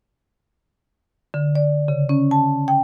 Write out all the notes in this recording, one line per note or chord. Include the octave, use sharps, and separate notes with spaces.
D3
D5
C#3
C#4
A5
G5